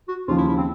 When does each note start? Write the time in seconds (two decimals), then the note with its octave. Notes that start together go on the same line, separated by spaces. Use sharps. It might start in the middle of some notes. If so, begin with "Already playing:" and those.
0.08 F#4
0.28 D#2 C#3 F3 F4
0.38 E4
0.48 E4
0.58 C4